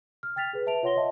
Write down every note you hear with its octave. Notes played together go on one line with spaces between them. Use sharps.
F6
G5 F6 A6 B6 F7
G#4 B4
B4 E5 A5 D7 F7
F4 C#5 F#5 C6 A#6 G7
D#5 E5 A5